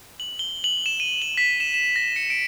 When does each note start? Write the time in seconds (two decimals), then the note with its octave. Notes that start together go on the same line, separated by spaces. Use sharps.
0.20 F#7
0.39 G7
0.64 F#7
0.86 E7
1.00 D#7
1.22 F#7
1.38 B6
1.60 E7
1.74 E7
1.96 A#6
2.16 C#7
2.30 D7